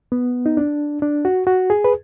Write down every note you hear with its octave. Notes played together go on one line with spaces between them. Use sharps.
B3
D#4
D4
D4
F#4
F#4
G#4
B4